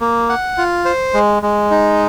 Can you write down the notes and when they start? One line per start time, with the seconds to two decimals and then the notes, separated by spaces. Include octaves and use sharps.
0.01 A#3
0.29 F#5
0.58 F4
0.85 C5
1.14 G#3
1.43 G#3
1.71 D#4